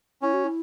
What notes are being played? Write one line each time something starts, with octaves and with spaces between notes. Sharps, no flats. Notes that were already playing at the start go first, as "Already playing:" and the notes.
C#4 E4
F#4
E4